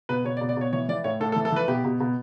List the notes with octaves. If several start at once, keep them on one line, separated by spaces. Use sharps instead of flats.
B2 B4
B2 C#5
D5
B2
D5
B2 C#5
E3 C#5
E3 D5
A2 C#5
A2 A4
A4
E3
A4
E3 B4
B2 G4
B2
B2